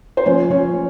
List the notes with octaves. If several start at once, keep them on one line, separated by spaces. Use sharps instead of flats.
C5
F3 C#4 C#5
F3 C#4 C#5